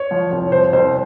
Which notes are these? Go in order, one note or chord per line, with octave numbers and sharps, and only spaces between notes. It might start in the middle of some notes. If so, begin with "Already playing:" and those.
Already playing: C#5
F3
C2 C#5
C2 C5
C2 C5